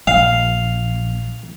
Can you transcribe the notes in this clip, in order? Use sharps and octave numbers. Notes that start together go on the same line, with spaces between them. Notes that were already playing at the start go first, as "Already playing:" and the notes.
A#1 F5